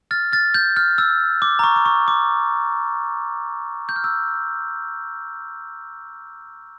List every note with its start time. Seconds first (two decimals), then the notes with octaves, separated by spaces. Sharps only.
0.11 F6 A6
0.33 F6 A6
0.54 G6
0.77 F6
0.98 E6
1.42 D6
1.59 A#5
1.64 C#6
1.76 D6
1.86 C#6
2.08 D6
3.89 G6
3.96 F6
4.04 E6